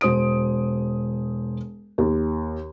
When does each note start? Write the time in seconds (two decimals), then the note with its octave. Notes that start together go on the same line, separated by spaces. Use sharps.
0.01 E1 C5 D#6 D7
1.98 D#2